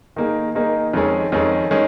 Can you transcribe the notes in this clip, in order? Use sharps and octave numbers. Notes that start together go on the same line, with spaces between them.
D#3 A#3 D#4 G#4
D#3 A#3 D#4 G#4
F2 D#3 G#3 C#4 G#4
F2 D#3 G#3 C#4 G#4
D#3 G#3 C#4 G#4